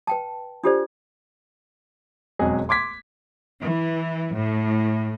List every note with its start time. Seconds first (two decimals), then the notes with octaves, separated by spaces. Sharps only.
0.07 B4 G5 A5
0.64 D4 F4 G4 A4 C5 D5
2.39 E1 F2 F#3 G#3 G#4 D#5
2.69 C6 D6 G#6 B6
3.60 E3
4.34 A2